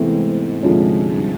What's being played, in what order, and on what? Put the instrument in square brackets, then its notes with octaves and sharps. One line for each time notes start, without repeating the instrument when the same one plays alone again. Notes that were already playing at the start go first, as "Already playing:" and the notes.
Already playing: [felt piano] E2 C3 E3 A3 C4 [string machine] G#2
[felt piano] D2 C3 F3 G#3 C#4
[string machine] G2